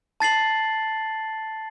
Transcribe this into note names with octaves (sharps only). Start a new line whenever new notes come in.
A5 A6 C7 F#7